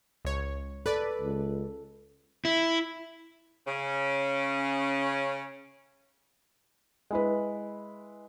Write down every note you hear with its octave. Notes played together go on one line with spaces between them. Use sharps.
C#2 C#5
A4 B4 D5
C#2
E4
C#3 C#4
G#3 E4 B4